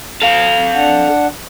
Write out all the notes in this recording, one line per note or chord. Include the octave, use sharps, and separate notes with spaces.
A4 F5
D4 F#5